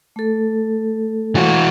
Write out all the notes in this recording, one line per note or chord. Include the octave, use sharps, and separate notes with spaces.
A3 A4
E3 F#4